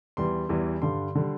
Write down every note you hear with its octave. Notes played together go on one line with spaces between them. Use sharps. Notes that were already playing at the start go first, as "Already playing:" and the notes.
E2 E3 G3 C6
E2 E3 G3
G2 D3 G3 C6
D3 G3